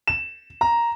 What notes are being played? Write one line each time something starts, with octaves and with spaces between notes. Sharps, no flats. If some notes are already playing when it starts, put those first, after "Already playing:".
E7
A#5